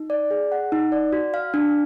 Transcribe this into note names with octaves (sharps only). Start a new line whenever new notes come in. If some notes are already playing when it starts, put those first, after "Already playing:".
Already playing: D#4
D5
G#4
F#5
D#4
D5
F#4
F5
D4